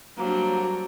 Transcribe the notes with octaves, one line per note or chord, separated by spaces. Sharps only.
F#3 G3 A#3 C4 D4